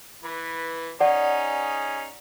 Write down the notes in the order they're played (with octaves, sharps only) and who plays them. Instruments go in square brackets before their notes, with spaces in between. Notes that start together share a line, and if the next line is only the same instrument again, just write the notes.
[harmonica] E3 B4
[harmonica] C#4 D#4 G#4 [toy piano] D5 F#5